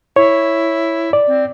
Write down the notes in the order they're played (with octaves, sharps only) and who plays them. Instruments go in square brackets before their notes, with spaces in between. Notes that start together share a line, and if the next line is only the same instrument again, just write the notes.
[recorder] E4 [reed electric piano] C#5
[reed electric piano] D5
[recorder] C4